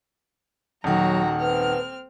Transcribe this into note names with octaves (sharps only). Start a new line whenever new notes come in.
D#1 D#3 F#3 F#4 F#5 A#5
C4 B4 F6